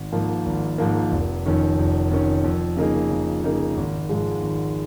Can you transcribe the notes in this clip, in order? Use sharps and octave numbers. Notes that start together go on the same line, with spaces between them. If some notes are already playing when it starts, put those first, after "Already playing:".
Already playing: G#1
G#2 F3 A#3
G#1
G#2 F3 A#3
F1
F2 D#3 C#4
F1
F2 D#3 C#4
F2
C#3 A#3 D#4 G#4
F2
C#3 A#3 D#4 G#4
G#1
G#2 F3 G#3
G#1